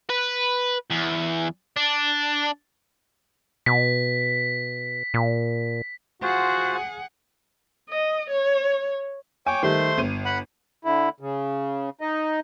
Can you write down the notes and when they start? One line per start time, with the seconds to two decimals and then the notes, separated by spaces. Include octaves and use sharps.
0.10 B4
0.90 E2
1.76 D4
3.66 B2 B6
5.14 A#2
6.22 F4 F#4 G#4 C5 F#5
7.90 D#5
8.30 C#5
9.47 C#5 G5 G#5 D6
9.63 D#3 G3 A3 C5 C6
9.98 G1 D#7
10.25 F#5 B5
10.85 D3 E4
11.20 C#3
12.01 D#4 D#5